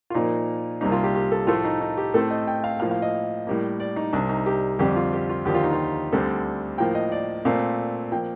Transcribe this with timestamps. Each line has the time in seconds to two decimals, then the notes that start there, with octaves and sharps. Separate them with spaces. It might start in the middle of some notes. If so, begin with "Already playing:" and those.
0.10 F4
0.14 A#2 F3 A#3 D#4
0.81 C2 C3 G3 A#3 D#4
0.92 F4
1.03 G4
1.15 G4
1.32 A4
1.47 A2 F3 A3 F4
1.65 D#4
1.81 D#4
1.97 G4
2.14 A2 A3 C4 A4
2.30 D#5
2.47 G5
2.64 F5
2.80 A2 F3 A#3 F5
2.91 F5
3.02 D#5
3.47 A2 G3 A#3
3.80 D5
3.96 D#4
4.13 C2 C3 G3 D4
4.29 D#4
4.46 G4
4.79 F2 D3 G3 C4 G4
4.96 F4
5.13 G4
5.29 F4
5.45 D#2 D3 F3 G4
5.54 F4
5.64 D#4
5.73 F4
6.13 D2 D3 G3 C4 A4
6.78 A2 F3 A#3 G5
6.95 D#5
7.12 D5
7.45 A#2 A3 C4 F5
8.12 F3 A#3 G5